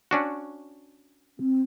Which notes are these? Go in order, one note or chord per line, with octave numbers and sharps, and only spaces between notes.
C#4 D4 F#4
C4